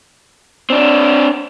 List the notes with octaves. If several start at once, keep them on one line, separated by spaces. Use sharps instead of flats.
C4 D4